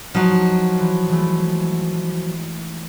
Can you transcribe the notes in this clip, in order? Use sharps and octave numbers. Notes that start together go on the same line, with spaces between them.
F3 F#3 D#4
E3
E3 G#3 A3